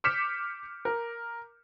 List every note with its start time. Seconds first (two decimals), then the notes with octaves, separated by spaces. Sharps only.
0.04 D6 F6 G6 B6 C#7 E7
0.85 A#4